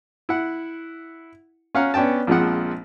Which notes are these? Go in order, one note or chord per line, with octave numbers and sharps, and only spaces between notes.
E4 F#5
C#4 F5 F#5 A#5
B3 C#4 D4 G5 A5
A#1 F3 G#3 C4 F#5